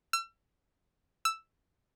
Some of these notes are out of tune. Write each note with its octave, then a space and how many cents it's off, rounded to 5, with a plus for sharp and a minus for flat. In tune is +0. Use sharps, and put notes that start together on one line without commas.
E6 +40
E6 +5